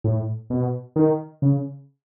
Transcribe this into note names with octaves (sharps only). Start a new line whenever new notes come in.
A2
B2
D#3
C#3